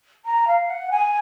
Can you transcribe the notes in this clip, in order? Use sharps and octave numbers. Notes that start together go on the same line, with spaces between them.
A#5
F5
F#5
G#5